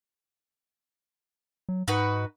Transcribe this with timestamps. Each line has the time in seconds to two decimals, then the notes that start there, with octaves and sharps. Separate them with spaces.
1.69 F#3
1.88 G#2 D#4 F#4 B4